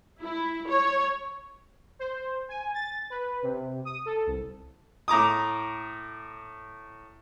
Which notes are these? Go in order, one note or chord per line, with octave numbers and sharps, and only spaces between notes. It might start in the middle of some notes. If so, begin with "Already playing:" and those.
E4
C#5
C5
G#5
A6
B4
C3
D#6
A4
C2
A2 A#5 D6 D#6